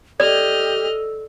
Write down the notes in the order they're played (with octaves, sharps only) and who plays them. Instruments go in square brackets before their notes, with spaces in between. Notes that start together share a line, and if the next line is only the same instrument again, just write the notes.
[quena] G4 [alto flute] A4 [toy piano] D5 [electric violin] D#5 F6